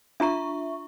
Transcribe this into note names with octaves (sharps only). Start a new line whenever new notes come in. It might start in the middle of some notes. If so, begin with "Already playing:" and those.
D4 F4 E5 A#5 C#6